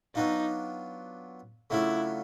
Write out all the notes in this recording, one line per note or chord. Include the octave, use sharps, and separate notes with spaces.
F#3 B3 D4 D#4 F4
C#3 F#3 A3 D4 E4 F4